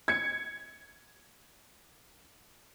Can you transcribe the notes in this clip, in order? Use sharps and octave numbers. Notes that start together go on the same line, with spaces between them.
G#6 C#7